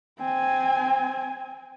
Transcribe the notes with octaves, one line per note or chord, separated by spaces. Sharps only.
C4 G#5